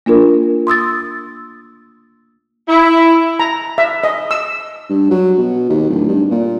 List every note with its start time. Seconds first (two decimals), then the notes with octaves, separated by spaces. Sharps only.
0.06 A#3 D4 F4 A#4
0.67 C6 D#6 E6 A6
2.68 E4
3.40 A#5
3.78 E5
4.04 D#5
4.31 E6
4.89 G2
5.11 F#3
5.38 B2
5.69 D#2
5.89 D1
6.08 G2
6.31 A#2